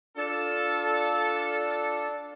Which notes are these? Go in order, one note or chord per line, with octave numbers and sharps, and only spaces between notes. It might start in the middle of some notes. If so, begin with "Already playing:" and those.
D4 F4 A4